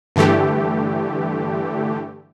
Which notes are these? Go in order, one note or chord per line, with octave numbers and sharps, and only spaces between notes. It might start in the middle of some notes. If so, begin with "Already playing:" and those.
G2 D3 E3 A3 G4